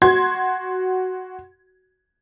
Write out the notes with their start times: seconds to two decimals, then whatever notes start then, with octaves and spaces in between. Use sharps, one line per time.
0.02 F#4 C6 G#6